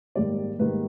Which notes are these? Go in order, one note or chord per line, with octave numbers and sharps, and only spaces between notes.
G#1 G#2 D#3 G3 A#3 D5
G#1 G#2 D#3 G3 A#3 B4